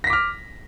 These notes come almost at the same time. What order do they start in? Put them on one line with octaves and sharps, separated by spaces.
A#6 B6 D6 F6